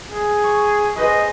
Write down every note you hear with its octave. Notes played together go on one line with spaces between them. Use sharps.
G#4
C#6
G#4 B4 C5 D#5